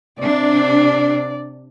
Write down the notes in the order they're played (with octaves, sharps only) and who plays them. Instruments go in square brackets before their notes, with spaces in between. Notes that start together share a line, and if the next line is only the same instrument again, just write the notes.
[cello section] C3 D4 [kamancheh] D5